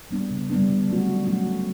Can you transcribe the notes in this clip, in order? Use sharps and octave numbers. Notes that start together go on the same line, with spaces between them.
G3 B3 D4
C#3
G3 B3 D4
D3
F#3 A3 C#4 F#4
D3
F#3 A3 C#4 F#4
G3